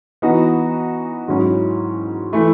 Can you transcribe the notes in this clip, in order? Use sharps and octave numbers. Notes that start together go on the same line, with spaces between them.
E3 B3 D#4 F#4
G#2 D#3 F#3 C#4 E4
E3 A3 E4